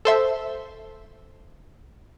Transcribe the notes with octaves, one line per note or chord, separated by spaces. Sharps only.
A4 C5 E5